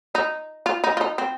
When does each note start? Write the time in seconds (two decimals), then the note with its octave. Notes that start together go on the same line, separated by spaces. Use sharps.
0.15 D#4
0.66 F4
0.84 D#4
0.97 F4
1.01 D#4
1.18 C4